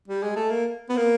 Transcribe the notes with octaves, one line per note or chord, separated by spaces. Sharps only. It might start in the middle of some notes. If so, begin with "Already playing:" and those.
G3
G#3
A3
A#3
B3
A#3